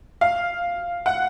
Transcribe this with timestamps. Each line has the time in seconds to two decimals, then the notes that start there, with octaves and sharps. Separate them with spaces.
0.21 F5
1.06 F#5